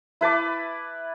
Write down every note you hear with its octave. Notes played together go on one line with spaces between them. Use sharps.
E4 B4 A5 D6